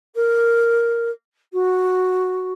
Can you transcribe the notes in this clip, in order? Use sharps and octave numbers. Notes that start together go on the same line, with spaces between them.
A#4
F#4